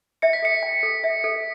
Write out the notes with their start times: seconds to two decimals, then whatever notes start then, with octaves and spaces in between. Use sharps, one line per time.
0.22 E5 C#7
0.33 B6
0.42 A4 C#7
0.63 G5
0.83 A4
1.04 E5
1.24 A4